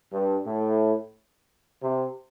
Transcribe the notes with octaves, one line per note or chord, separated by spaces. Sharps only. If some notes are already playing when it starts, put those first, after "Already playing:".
G2
A2
C3